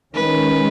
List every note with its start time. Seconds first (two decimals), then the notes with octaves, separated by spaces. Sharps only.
0.15 D#3 G#3 C#4 B4